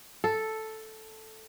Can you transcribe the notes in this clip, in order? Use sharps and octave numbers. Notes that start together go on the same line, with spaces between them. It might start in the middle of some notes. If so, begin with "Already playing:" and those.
A4